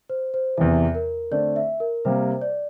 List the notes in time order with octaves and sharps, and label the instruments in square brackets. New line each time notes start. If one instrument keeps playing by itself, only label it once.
[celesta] C5
C5
[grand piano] E2 C3 E3 [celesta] E5
[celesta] A#4
[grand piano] D3 A3 C4 [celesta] D5
[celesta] E5
A#4
[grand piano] C3 G3 A#3 [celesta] C5
[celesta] D5